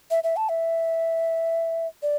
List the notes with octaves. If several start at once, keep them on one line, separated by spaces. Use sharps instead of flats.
E5
E5
A5
E5
D5